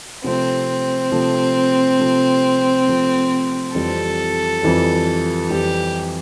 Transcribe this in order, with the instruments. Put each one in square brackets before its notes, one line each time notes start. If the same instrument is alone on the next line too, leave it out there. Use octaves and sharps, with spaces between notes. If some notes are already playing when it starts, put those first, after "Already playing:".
[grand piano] C3 F3 A3 [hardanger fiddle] C4
[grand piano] C3 F3 A3
C3 F3 A3
C3 F3 A3
[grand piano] F2 E3 G3 [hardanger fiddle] A4
[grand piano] F2 E3 G3
[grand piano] F2 E3 G3 [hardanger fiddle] G4